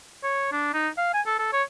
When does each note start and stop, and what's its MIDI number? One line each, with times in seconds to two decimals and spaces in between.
0.24 0.48 73
0.52 0.72 62
0.74 0.89 63
0.98 1.10 77
1.14 1.21 80
1.26 1.38 69
1.39 1.53 69
1.53 1.63 73